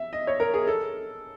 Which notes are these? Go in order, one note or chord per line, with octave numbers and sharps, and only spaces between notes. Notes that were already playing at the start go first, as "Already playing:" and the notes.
Already playing: E5
D#5
C#5
A#4
G#4
A4